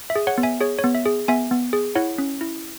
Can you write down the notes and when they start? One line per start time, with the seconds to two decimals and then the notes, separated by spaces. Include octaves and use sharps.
0.10 E5
0.16 G#4
0.27 C#5 F#5
0.38 B3
0.43 E5 G#5
0.61 G#4 C#5
0.79 C#5
0.84 B3
0.95 E5
1.06 G#4
1.28 B3 E5 G#5
1.51 B3
1.73 G#4
1.95 E4 C#5 F#5
2.18 C#4
2.41 E4